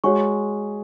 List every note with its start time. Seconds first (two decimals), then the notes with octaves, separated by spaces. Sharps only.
0.04 G#3 F#4 C#5 F#5 C#6